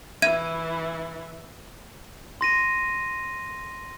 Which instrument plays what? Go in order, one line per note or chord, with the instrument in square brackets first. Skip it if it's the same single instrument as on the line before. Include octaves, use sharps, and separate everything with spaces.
[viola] E3 E4 [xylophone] E5 G#6 D#7
[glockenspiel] C6 A#6 D#7